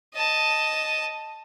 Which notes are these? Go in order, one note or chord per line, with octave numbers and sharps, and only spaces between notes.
D#5 A5